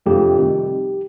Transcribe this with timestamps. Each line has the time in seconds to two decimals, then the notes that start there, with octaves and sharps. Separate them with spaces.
0.06 F2 C3 F3 A3 D4 G4
0.36 C3 D#3 G3